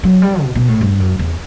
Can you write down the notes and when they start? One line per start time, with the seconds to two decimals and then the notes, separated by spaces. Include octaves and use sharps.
0.03 F#3
0.22 G3
0.42 B2
0.55 B2
0.68 A2
0.81 G2
1.00 F#2
1.19 E2